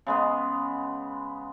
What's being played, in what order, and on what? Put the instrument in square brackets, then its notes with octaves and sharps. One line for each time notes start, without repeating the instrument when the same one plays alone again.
[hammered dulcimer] C#3 G#3 B3